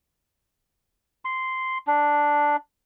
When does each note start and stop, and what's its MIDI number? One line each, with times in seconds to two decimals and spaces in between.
1.25 1.78 84
1.87 2.56 62